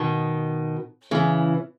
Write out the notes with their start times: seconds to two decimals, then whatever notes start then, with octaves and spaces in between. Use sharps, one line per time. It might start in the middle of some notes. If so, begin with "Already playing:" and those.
Already playing: B2 D#3
1.11 C#3 E3